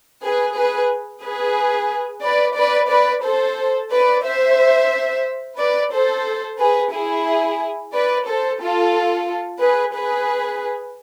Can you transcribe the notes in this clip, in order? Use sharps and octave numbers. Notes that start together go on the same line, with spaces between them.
G#4 B4
G#4 B4
G#4 B4
B4 D5
B4 D5
B4 D5
A4 C5
B4 D5
C5 E5
B4 D5
A4 C5
G#4 B4
E4 G#4
B4 D5
A4 C5
F4 A4
G#4 B4
G#4 B4